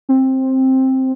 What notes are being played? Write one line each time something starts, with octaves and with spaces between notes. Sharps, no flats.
C4